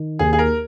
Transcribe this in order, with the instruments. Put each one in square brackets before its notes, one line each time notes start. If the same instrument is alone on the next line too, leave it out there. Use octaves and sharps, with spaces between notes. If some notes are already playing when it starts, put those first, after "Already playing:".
Already playing: [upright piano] D#3
[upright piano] D#2 [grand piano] G#4
[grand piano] G#4
A#4